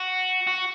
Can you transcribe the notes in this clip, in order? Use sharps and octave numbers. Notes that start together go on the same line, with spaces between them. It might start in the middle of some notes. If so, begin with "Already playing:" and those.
Already playing: F#4
F#4